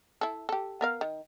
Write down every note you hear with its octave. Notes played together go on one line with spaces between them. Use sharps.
E4 A4
G4 A4
B3 A#4 F5
D#3